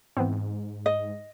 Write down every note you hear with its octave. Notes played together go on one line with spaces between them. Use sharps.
G#2 E3 B3 C4
D#5